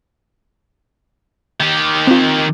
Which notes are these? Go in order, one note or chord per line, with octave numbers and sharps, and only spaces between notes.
D#3 G4
C4 F4